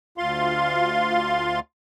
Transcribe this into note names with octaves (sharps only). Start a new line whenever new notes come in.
D2 F4 F5 C6